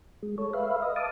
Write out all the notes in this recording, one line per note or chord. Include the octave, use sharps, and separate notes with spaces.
G#3
A4 C#5
B4 E5 F5
D#5
F5 A5 D6 D#6